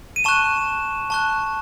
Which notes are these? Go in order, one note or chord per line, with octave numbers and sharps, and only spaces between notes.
D#7
A5 C#6 F#6 E7
A5 C#6 F#6